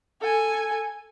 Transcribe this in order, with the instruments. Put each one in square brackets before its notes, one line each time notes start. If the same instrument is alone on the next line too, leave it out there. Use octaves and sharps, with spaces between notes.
[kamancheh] A4 G#5